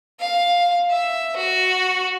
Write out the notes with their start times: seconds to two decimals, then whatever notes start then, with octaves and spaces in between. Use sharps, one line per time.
0.20 F5
0.90 E5
1.37 F#4